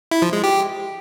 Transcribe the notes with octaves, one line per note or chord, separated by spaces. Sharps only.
E4
F3
G#3
G4